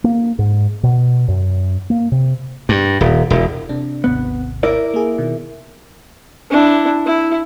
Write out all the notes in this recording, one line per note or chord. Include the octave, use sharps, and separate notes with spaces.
A#3
G#2
B2
F#2
A#3
C3
G2
D#1
E1
C3 D4
G#1 D#2 C3 B3
E4 A#4 D5
A#3 G#4
B2 D#3
D4 E4
E4